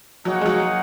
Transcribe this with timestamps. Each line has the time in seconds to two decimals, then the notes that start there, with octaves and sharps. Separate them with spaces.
0.25 F#3 A#3 D#4 G#4 C#5 F#5
0.41 G#3
0.46 F#3